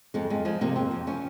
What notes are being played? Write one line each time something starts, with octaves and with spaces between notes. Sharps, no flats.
F2 G#3
F2 G#3
F3 G#3
C3 A#3
F2 C4
F2
F3 C#4